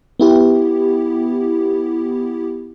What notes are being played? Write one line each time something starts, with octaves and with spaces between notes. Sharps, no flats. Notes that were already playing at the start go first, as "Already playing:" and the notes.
B3 E4 G4